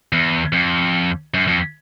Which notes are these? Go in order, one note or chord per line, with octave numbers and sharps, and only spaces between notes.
E2
F2
F#2
F2